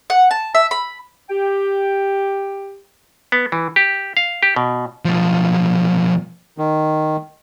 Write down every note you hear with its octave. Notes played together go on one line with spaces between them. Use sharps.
F#5
A5
E5
B5
G4 G5
B3
E3
G4
F5
G4
B2
B1 F3
D#3